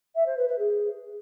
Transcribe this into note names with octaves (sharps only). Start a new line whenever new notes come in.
E5
C5
B4
B4
G#4